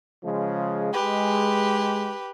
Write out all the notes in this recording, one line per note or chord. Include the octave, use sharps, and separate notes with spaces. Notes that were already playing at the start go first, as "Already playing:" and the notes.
C#3 F3 G#3
G#3 G4 B4